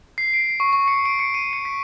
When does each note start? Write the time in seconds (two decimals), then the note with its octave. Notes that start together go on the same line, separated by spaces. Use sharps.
0.18 C7
0.34 D7
0.60 C#6
0.73 C#6
0.88 C#7
1.05 D7
1.19 C#7
1.34 D#7
1.53 C#7
1.65 B6